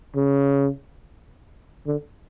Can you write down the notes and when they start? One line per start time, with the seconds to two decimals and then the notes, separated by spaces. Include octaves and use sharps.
0.16 C#3
1.87 D3